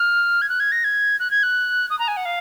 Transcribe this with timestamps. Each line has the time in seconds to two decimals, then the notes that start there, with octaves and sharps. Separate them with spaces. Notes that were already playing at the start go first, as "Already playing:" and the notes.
Already playing: F6
0.42 G#6
0.49 F#6
0.60 G#6
0.72 A#6
0.84 G#6
1.20 F#6
1.31 G#6
1.43 F#6
1.90 D#6
1.99 A#5
2.08 G#5
2.17 F#5
2.25 F5